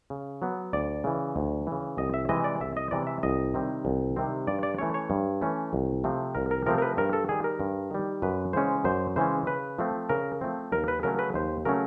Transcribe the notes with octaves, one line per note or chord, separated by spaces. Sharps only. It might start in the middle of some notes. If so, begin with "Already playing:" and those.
C#3
F#3 B3
D2 D5
C#3 E3
D2
C#3 E3
C2 D#5
E5
C3 E3 G#3 D#5
D5
C2 E5
D#5
C3 E3 G#3 D5
E5
C2 D#5
C3 D#3 G3 C4
C2
C3 D#3 G3 C4
G2 D5
D5
E3 A3 C#4 C#5
C#5
G2
E3 A3 C#4
C2
C3 F3 A3 C4
C2 A#4
A#4
C3 F3 A3 C4 A#4
A#4
B4
G2 A#4
A4
D#3 G3 G#4
A#4
G2
D#3 G3
F#2 B4
C#3 E3 G#3 C#4 C5
F#2 C5
C#3 E3 G#3 C#4 C5
C#3 B4
F3 A3 C4
C#3 A#4
F3 A3 C4
D#2 A#4
B4
C#3 F#3 A3 C#4 A#4
B4
D#2 C5
C#3 F#3 A3 C#4 A#4